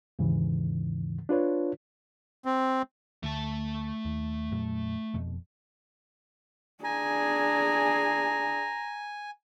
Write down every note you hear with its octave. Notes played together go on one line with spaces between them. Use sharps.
D#2 G#2 C#3 E3
D4 F4 B4 C#5
C4
D2 A3 A5
D#2
F2 A#2 F#3
F1 F2 B2
D4 G#4 G#5 A#5